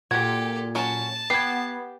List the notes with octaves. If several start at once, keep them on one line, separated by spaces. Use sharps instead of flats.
A#2 F#4 G4 A4 G#6
F#3 C#4 A5
B3 G4 G#6 C7